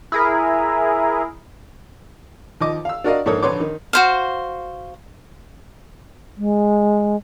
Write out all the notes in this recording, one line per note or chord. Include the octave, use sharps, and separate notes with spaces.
E4 G#4 A#4
D#2 F3 D#5 D6
F5 E6
D4 F#4 A#4 D5 D#5 F5
A#1 G#2 A#3 A4 C#5 D#6
A#1 D3 B4 C#5 C6 D6
D#3
F#4 C5 F5
G#3